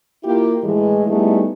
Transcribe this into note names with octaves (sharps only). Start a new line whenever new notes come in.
A#3 E4 F4 G4
A2 E3 G#3
G3 A3 B3 D#4 E4 G#4